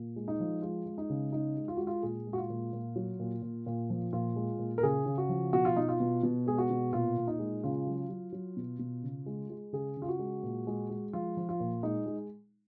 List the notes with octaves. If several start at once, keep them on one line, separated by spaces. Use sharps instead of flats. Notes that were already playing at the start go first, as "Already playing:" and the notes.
Already playing: A#2
G#3
D#4
F3
G#3 F4
G#3
D#4
C#3
G#3 D#4
G#3
F4
G#3 F#4
F4
A#2 G#4
G#3
F#4
F4
A#2
A#2
F#3
A#2
A#2
A#2
F3
A#2 F4
G#3
A#2
A#4
C#3 G#4
C#3
F#4
F3
B2 F#4
F4
B2 D#4
F4
B2
B2
G#3 G#4
F#4
B2
A#2 F4
A#2
D#4
G#3
C#3 F4
F#3
F#3
F#3
B2
B2
C#3
G#3
G#3
C#3 G#4
C#3
F4
F#4
G#3
A#2
G#3
G#3
F3 F4
F3
F4
A#2
G#3 D#4
G#3